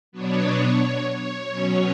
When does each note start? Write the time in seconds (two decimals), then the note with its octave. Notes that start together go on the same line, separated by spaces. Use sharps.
0.12 B2 F#3 B3 D4 C#5
1.15 C#5
1.48 B2 F#3 C#4